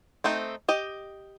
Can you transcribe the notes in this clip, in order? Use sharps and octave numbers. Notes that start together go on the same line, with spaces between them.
A3 C4 D#4
G4 D#5